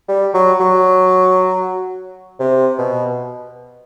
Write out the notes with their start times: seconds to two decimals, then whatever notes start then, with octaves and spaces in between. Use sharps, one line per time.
0.08 G3
0.34 F#3
0.60 F#3
2.40 C3
2.79 B2